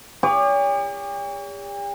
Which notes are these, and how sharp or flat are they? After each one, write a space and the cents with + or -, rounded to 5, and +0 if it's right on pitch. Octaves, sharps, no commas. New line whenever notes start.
G4 +45 C#5 +45